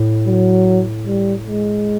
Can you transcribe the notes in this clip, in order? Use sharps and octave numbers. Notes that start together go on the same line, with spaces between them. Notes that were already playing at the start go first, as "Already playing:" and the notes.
Already playing: A2
F#3
G3
G#3